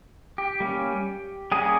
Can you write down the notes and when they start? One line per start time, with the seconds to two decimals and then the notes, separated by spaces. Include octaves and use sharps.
0.38 G4
0.60 G3 A#3 C#4
1.52 G3 A#3 C#4 G#4